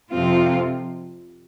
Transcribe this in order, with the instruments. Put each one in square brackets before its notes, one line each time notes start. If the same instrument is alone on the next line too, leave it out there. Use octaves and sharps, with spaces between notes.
[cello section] F2 C3 F3 C4 F4